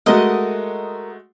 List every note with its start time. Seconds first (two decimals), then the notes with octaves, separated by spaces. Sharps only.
0.06 G#3 A3 F#4 A#4 D#5 F#5